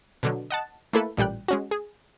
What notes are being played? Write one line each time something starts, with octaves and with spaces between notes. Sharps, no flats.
B2 D3 F#3
D#5 F#5 A5
A3 A#3 E4 A4 B4
A1 A#2 G3 G5 F#6
G#3 C#4 F#4
G#4